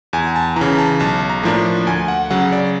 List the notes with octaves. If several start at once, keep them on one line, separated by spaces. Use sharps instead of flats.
E2 G#5
A5
C#3 E3 A#5
A5
B1 A5
A#5
A2 F3 A#3 D4
D2 G#5
F#5
C#3 F#3 F#5
D5